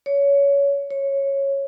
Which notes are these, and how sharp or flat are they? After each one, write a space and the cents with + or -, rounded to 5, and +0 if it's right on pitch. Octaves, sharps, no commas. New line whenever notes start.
C#5 +20
C#5 -10